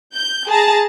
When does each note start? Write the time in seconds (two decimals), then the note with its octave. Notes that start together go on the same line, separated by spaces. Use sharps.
0.14 G6
0.48 G#4 A5 A#5